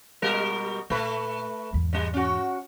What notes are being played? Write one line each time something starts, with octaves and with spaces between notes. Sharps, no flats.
B2 G3 A#4
A#2 A3 B4
E2 G#2
F#2 G3 G#3
C#4 F#4